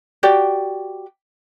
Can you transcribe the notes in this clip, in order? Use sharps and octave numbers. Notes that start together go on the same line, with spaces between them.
F#4 G4 D5 G5